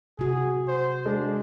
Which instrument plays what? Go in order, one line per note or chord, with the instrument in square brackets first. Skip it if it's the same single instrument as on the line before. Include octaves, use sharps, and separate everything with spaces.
[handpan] C3 F#4 [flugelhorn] G#4
[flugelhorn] C5
[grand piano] G#3 [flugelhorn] D4